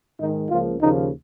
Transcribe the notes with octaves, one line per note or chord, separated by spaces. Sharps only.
G#2 D#3 G#3 D#4
C#2 C#3 F3 A#3 F4
D#2 C#3 F3 A#3 D#4